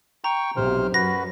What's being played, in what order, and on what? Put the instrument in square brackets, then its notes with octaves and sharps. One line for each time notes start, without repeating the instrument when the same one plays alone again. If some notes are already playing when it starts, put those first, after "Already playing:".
[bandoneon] G5 C#6 [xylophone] A#5
[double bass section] B1 [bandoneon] C3 C5 F6
[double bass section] F#2 [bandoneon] F#4 B4 [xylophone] A#6